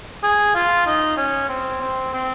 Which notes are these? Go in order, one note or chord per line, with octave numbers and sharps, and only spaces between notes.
G#4
F4
D#4
C#4
C4
C4
C4